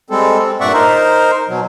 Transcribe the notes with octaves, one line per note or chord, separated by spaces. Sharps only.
G3 G#3 C4 A4
C4
G2 A#2 D5 E5 F#5 C#6
D#4 A#4 C5
B2 F#3